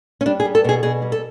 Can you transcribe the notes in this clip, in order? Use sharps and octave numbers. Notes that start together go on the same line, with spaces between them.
C#4
G3 D4
G#4
G3
A4
B2 G#4
B2 G#4
G3
A4